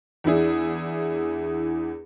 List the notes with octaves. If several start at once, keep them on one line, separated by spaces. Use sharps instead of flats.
E2 D4 E4 G#4